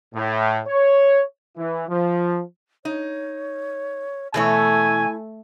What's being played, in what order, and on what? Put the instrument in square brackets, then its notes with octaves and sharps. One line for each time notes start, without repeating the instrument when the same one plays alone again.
[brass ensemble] A2
C#5
E3
F3
[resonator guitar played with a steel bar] D#4 [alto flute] C#5
[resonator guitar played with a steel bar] B2 E3 C#5 [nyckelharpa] A3 [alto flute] E4 [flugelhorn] G#5